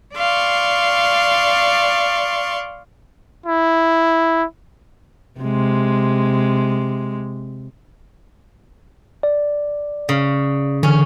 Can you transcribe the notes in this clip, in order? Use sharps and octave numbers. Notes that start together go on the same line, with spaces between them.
D5 F5 C6 C#6
E4
C3 G#3
D5
C#3
D3 E3 C#4